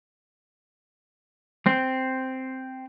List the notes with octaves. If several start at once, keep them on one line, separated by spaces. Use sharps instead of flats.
C4